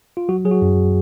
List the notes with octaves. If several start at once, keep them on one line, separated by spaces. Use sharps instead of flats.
F4
F#3 F#4
F#3 G#4
F#4
F#2